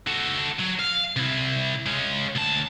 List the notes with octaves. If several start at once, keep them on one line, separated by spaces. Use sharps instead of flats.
F#4 A4
F#3
F5
C3 E4
G#3 C#4
D2 A5